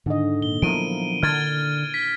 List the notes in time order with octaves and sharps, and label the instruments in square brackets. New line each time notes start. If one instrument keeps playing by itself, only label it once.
[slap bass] G#2 [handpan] D3 D#3 D#5
[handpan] A#2 [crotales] G7
[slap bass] F3 F#3 B3 [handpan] E4 A#4 [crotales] D7 D#7
[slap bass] D3 [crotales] F6 G#6 A6
[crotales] B6